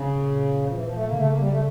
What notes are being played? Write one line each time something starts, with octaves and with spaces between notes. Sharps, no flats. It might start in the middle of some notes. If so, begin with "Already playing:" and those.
Already playing: C#3
A#2
F3
E3
F3
A3
A#3
D3
C#3 A3
A#3
G3
A3